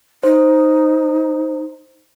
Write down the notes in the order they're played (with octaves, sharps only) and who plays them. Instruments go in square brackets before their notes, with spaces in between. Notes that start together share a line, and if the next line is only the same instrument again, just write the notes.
[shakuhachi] D#4 [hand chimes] C5